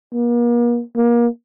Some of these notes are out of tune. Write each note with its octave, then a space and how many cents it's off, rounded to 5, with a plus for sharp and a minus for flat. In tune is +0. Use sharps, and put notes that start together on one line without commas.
A#3 +40
A#3 +30